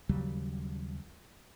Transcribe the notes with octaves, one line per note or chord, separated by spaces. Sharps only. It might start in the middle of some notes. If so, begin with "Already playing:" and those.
D#2 C#3 F#3 G3